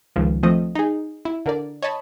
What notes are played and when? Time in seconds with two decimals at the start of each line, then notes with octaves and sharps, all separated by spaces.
0.16 C#2 D#3 F3
0.43 F3 A3 C4 D#5
0.75 D#4 G#4
1.25 E4
1.46 D3 A#4 D5
1.82 C#5 D#5 A5 B5